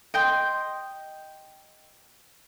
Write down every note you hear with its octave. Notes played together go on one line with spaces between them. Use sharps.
D#5 G5 C6